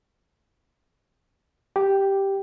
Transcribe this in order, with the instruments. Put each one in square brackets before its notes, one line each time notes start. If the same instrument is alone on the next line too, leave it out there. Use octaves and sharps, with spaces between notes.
[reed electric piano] G4